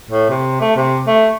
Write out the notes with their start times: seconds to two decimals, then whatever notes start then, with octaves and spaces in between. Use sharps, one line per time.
0.11 A2
0.29 C3
0.61 A3
0.76 C3
1.07 A3